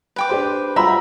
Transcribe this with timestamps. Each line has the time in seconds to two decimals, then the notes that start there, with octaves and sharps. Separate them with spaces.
0.16 B4 G5 D6
0.29 D4 G4 C5 C6
0.76 G3 F4 F#4 E5 A#5 B5